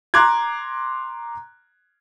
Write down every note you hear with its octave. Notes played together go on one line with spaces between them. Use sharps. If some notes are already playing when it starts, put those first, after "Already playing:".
A#5 C6 D6 F#6 G#6